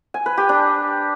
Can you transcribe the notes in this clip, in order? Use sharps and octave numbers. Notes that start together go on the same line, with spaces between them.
G#5
B4
G4
D4